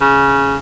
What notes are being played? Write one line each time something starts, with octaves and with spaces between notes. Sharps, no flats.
C#3